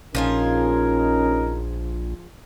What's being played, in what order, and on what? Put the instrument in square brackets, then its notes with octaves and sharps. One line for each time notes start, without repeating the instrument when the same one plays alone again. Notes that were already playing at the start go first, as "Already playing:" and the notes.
[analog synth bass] A#1 [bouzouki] F3 F4 G#4 [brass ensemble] C#4 D#4 A#4